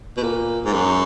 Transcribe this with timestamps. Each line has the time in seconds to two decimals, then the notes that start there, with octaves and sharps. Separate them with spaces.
0.17 B2
0.23 A#2
0.65 G#2
0.74 F#2